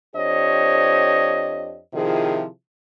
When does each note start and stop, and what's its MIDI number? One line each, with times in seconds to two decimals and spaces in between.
0.15 1.79 41
0.15 1.79 62
0.15 1.79 67
0.15 1.79 72
0.15 1.79 73
0.15 1.79 75
1.94 2.46 48
1.94 2.46 51
1.94 2.46 53
1.94 2.46 64
1.94 2.46 65
1.94 2.46 68